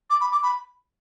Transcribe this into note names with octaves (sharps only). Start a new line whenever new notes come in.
D6
B5
D6
B5